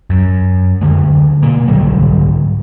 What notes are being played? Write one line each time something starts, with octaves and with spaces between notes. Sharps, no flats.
F#2
D2 D3 F3 G#3
B2 A#3
G#2 D3 F#3 G3